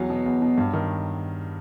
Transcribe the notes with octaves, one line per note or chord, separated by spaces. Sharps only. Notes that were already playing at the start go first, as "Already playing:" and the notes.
Already playing: E2 F#3
B2
E2
B2
G2
D#3